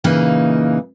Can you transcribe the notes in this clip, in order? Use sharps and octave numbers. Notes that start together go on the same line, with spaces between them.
A#2 C#3 E3 A#3 D#4